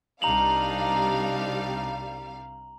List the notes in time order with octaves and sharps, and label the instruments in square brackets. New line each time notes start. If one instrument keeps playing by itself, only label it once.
[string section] C2 G3 F5 [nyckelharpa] D4 D#4 [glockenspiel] A#5 F7 F#7